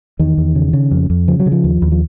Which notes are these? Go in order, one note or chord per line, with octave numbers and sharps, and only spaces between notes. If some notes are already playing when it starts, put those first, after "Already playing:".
E2 D#3
E2
C#3
C#3
F2
F2
C#3 F3
F#3
C#3
F3
D#2
D#2
F3